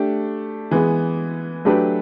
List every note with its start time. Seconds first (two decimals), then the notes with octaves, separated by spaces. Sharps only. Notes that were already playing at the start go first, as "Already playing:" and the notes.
Already playing: A3 D4 G4
0.71 E3 G#3 B3
1.65 F#3 A3 D4 G4 B4